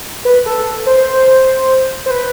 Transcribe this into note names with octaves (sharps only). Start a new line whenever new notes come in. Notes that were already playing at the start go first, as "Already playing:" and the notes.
B4
A4
C5
C5
B4